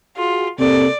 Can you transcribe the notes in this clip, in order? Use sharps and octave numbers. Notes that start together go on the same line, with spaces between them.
F4 F#4 G#4
C3 A#3 A4 D5